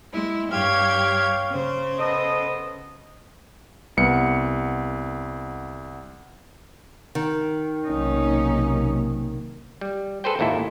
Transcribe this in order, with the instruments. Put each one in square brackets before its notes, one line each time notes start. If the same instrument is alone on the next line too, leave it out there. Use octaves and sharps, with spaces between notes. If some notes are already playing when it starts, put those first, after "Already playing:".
[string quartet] G#3 E4
[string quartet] G2 G4 G#6 [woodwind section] C#5 F5
[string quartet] C#3 C5
[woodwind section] B3 A4 D#5
[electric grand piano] C2 B3 C#7
[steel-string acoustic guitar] D#3
[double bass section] B1 C3 A#3 [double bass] C#4 D#4
[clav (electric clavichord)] G3
G#4 A4 B4 C5 G5
G#1 D#2 A#2 E4 A4